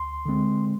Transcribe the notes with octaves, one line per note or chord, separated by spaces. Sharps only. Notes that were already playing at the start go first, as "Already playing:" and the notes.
Already playing: D2 C6
D3 G#3 C4